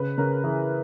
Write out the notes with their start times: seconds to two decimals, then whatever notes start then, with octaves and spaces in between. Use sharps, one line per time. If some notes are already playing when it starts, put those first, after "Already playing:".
Already playing: C#3 B4
0.18 C#3 A#4
0.44 E3 G#4